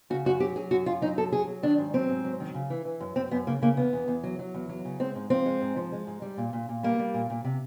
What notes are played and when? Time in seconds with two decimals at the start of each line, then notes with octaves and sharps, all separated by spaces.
0.10 C#3 F#4
0.25 F#2 F#4
0.40 F#3 G4
0.56 F#3 G#4
0.71 F#2 F#4
0.86 F#2 F4
1.01 F#3 D#4
1.17 F#2 A4
1.32 F#3 G#4
1.47 F#3
1.63 D#3 D4
1.78 G#2
1.93 F#3 C4
2.09 G#2
2.24 F#3
2.40 D#3
2.55 C#3
2.70 E3
2.85 E3
3.00 F#2
3.16 F#2 C4
3.31 F#2 B3
3.47 C#3 A#3
3.62 C#3 A#3
3.77 E2 B3
3.93 E2
4.08 E2
4.23 F#3
4.39 F#3
4.54 E2
4.69 F#3
4.85 C#3
5.00 G#3 C4
5.15 G#2
5.30 F3 C4
5.46 G#3
5.61 G#2
5.76 F3
5.92 G#3
6.07 G#2
6.22 G3
6.38 A#2
6.53 A#2
6.69 A#2
6.83 G3 A#3
6.99 G3
7.14 A#2
7.30 A#2
7.44 C3